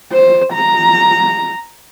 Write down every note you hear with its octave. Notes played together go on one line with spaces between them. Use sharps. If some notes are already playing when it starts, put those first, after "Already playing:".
C5
A#5